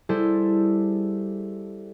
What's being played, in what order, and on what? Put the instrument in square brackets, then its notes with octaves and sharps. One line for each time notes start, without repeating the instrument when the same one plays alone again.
[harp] G3 E4 G#4 A4 C5